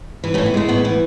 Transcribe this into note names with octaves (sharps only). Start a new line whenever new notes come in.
E3 B3
A3 C#4
A2
B3
G#3 A3
A2 B3
E3 B3